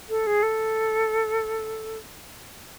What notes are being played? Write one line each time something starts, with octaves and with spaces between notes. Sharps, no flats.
A4
G#4
A4